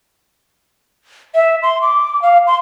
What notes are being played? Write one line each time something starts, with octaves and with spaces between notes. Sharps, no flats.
E5
C6
D6
F5
C6